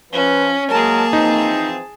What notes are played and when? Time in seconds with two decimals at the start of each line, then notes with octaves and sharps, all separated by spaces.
0.13 F3 C#4 B4
0.70 F#3 G#3 A#3 G#4 A#4 A5
1.13 E3 F3 C4 D#4